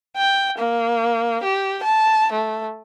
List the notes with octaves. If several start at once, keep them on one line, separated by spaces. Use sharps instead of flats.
G5
A#3
G4
A5
A3